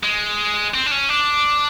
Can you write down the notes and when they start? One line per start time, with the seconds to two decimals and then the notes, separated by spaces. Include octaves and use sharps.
0.03 G#3
0.74 C4
0.86 D4
0.92 C#4
1.09 D4